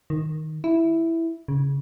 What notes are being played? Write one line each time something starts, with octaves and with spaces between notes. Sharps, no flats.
D#3
E4
C#3